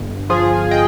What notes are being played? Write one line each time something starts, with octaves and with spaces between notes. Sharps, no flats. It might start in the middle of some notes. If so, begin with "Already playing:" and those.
Already playing: G1
F3 F4 G#4
D#5 G5